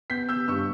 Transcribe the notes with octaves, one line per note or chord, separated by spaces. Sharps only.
B3 G6 B6
B3 E6 G6
G2 C#6 E6